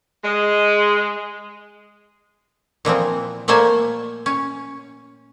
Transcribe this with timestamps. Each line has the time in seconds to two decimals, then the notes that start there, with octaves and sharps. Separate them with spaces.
0.24 G#3
2.85 A#2 E3 F3 C4
3.48 A#2 A3 A#3 C5 G#5
4.26 C#4